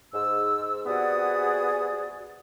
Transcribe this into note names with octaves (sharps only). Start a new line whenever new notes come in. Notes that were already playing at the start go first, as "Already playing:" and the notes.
G#2 E6
C3 B3 F#4 G#4 D5 D#6